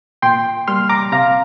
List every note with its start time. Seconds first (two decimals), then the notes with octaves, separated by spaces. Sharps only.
0.22 A#2 G5 C6
0.68 G3 A#3 C6 F6
0.89 A#5 D6
1.12 C3 F5 A#5